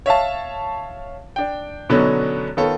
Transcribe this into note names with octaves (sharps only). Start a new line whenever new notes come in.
C#5 E5 F5 A5
D4 G5
B2 D3 F#3 B3 C#4 D#4
D#3 B3 F4 A4 C#5